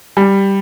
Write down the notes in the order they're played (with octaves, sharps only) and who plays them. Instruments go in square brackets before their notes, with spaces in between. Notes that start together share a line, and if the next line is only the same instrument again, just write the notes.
[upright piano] G3